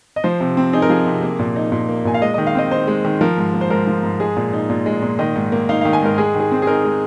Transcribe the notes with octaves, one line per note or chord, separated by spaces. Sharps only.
D#5
F3 C5
C3
C4
D#4 G#4
A#4
F3 G#4
C3
A#3
A#2
D#4
A#2
A#3
A#2 G#5
F5
G#3 D#5
D#3 D#5
F5
C4 D#5
D#4 C5
G#3
D#3
F3 A#4
G#2
A#3
C5
G#2 A#4
F3
G#2
G#3 G#4
A#2
D#4
A#2
G#3
A#2
D#3 D#5
G#2
A#3
D#4 F5
D#3 F5
G#5
G#2 A#4
G#3 G#4
D#3
G#4
C4
G#4
D#4 A#4
G#3